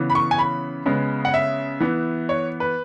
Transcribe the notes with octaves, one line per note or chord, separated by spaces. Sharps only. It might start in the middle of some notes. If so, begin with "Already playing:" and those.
Already playing: C#3 E3 B3
B5
C#6
G#5
B5
C#3 G#3 B3
F#5
E5
E3 B3
C#5
B4